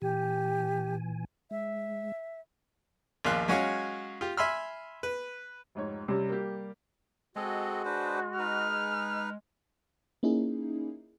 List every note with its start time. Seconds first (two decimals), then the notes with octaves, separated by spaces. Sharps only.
0.02 A#2 E3 G4 G#5
1.51 G#3 E5
3.25 A#1 D#2 A#2 F5 C6 F#6
3.48 F#3 G#3 C#4 F#4 C#5 F5
4.21 F4 G4
4.37 E5 G#5 B5 C6 E6 F6
5.03 B4
5.75 F1 G#2 C#5
6.08 C3 G3 C#4
6.29 A#3 G4
7.36 G#3 C4 F#4 A4 D#5
7.85 D4 B4 C5
8.39 D#4 B4 F6
10.23 A#3 C#4 D#4 E4 G#4